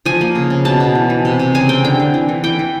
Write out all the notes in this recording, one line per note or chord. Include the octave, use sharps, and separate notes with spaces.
F3 G#5
A#3
C#3
C#3
B2 A5
B2
E3
E3
C3
C3
C#3 G#5
C4 G5
D3 G5
D3
E3
E3
E3 G5
E3